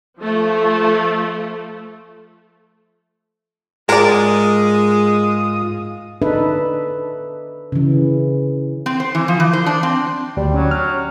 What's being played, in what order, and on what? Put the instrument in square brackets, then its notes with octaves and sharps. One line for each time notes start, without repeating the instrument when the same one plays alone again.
[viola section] F3 A3
[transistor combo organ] G#2 F4 D#6 [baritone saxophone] G#3 [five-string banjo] A#4 D5
[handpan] D4 D#4 A4 B4 E5
C#3 E3
[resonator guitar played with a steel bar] C4
C5
E3
F3
E3
C5
D4
C4
[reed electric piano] D2 [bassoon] G3
[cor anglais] F#3 [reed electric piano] C#4
[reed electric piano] F6
[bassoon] C#4